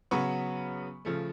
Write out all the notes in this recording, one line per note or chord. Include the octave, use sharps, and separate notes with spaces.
C#3 F#3 B3 B5 C#6
C#3 F3 A3